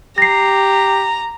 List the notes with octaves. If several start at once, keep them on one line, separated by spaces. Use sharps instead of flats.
G4 A#5 A#6 C7